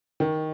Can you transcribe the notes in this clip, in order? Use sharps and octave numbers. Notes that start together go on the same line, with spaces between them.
D#3